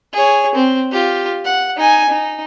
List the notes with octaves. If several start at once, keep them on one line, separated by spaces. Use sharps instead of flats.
G#4 C#5
C4
F4 G4
F#5
D#4 G#5
D#4